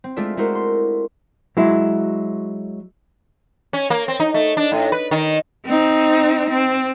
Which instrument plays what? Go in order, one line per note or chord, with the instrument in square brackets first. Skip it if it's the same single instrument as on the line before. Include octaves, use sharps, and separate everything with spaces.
[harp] C4
G#3 A3 D4 F4 D5 E5
G#3 A3 E4 F#4 A#4 C5
C6
[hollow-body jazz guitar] F#3 G#3 E4
[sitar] C#4
A#3
C4
D#4
A3
D4
A2
B4
D#3
[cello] C4 D#4
C4